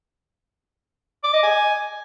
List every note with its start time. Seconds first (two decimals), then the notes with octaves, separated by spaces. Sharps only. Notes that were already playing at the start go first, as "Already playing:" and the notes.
1.24 D6
1.33 D#5
1.43 G#5